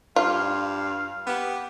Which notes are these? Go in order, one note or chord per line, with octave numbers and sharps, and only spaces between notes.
G2 F4 F5
B3 G4